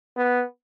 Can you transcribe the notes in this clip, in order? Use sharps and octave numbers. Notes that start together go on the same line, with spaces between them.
B3